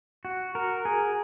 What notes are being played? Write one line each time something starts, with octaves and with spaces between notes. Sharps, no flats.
F#4
A#4
G#4